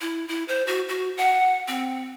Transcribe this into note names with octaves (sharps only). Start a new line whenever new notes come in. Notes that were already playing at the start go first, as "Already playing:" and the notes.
E4
E4
C5
F#4
F#4
F#5
C4